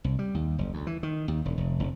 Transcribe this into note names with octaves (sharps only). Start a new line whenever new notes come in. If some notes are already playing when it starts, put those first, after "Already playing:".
C2
G3
D#2
F#1
D2
E3
D#3
D#2
E1
F1
F1